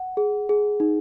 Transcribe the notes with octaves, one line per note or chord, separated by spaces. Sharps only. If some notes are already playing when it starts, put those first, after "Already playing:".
Already playing: F#5
G#4
G#4
D#4